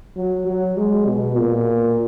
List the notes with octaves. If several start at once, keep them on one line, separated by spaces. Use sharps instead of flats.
F#3
F#3
G#3
B2
A#2